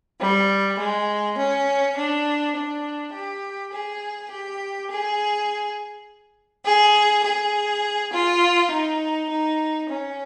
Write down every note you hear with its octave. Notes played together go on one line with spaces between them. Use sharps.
G3
G#3
C#4
D4
D4
G4
G#4
G4
G#4
G#4
G#4
F4
D#4
D#4
C#4